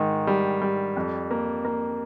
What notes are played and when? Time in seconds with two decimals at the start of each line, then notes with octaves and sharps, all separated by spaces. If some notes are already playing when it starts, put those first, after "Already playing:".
Already playing: G#2 D#3
0.27 G3
0.62 G3
0.97 F2
1.31 A#3
1.65 A#3